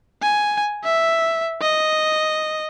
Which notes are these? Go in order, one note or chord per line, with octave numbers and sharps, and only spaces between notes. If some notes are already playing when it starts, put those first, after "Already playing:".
G#5
E5
D#5